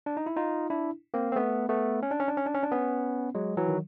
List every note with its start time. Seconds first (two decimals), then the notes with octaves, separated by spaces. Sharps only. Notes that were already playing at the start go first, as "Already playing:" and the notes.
0.06 D4
0.17 D#4
0.26 E4
0.36 D#4 F4
0.70 D4 E4
1.14 A#3 C4
1.32 C4
1.36 A3 B3
1.69 A3 B3
2.03 C#4
2.11 D4
2.20 C#4
2.28 D4
2.37 C#4
2.46 D4
2.55 C#4
2.63 D4
2.72 B3 C#4
3.35 F#3 G#3
3.57 E3 F#3
3.68 D#3